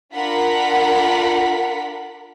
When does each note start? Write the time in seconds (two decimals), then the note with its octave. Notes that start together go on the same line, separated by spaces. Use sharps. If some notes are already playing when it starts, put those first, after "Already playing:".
0.13 D4 F4 A#4 F#5 B5 B6